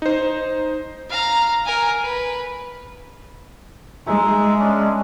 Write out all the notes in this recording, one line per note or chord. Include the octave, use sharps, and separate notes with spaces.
D#4 C5
F5 A#5
A#4 G#5
B4
G#3 D#4 E5
C#4 D4